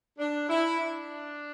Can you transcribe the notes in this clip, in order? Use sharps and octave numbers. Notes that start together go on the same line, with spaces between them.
D4
E4
D4